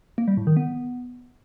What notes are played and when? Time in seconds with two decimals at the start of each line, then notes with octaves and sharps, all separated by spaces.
0.18 A#3
0.28 G3
0.37 A2
0.47 D#3
0.57 B3